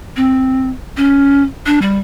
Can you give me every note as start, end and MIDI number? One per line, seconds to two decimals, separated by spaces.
0.16 0.69 60
0.97 1.43 61
1.66 1.79 62
1.82 1.99 55